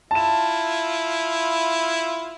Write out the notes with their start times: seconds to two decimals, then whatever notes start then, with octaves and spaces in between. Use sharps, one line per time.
0.11 E4 F4 A5 E7